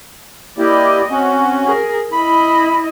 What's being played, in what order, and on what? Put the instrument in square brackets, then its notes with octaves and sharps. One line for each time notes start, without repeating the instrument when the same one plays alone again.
[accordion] A#3 E4 G4 [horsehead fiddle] D5 D#5
[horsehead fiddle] C4 [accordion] C#4 F#4
[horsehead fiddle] G#4 A#4
[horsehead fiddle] E4 D#5 [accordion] B5